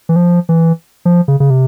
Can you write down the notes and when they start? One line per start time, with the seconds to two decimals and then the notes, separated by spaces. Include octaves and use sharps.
0.09 E3
0.16 F3
0.49 E3
1.05 F3
1.28 C#3
1.40 C#3
1.50 C3